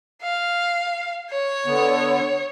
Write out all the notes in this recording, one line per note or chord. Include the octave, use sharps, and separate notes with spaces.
F5
C#5
D3 B3